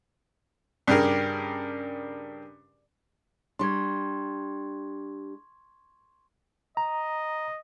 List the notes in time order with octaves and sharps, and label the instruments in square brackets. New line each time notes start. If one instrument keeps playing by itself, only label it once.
[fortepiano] G2 C#3 G4 G#4 A#4 F6
[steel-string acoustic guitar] G3 D4 [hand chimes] C6 C#6 G#6
[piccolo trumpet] D#5 [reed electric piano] A#5